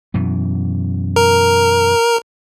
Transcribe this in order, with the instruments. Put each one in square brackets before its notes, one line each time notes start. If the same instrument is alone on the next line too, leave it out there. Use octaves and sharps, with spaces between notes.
[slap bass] F#2 B2 E3
[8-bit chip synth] A#4